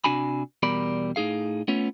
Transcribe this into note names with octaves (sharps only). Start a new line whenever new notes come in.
C3 D4 F#4 G#5 B5
E2 B2 G3 A#4 D5 B5
A2 D#4 G#4 F5
A3 B3 C#4 F4 C#5